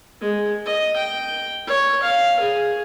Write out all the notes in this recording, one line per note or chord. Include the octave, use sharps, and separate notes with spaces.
G#3
D#5
G5
C#5
F5
G#4